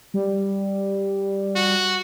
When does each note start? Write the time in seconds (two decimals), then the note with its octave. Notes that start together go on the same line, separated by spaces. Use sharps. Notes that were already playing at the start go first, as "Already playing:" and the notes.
0.14 G3
1.56 F#4